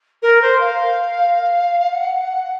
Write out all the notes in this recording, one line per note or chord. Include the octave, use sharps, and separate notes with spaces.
A#4
C5
F5
F#5